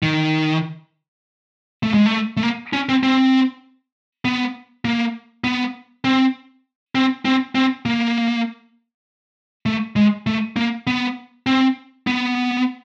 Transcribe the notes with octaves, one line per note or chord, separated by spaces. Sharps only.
D#3
A3
G#3
A3
A3
A#3
C#4
C4
C4
B3
A#3
B3
C4
C4
C4
C4
A#3
A3
G#3
A3
A#3
B3
C4
B3